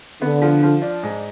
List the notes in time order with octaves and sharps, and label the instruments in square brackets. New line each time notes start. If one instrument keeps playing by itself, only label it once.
[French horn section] D3 [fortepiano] B3
[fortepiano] F3
F3
D4
G#2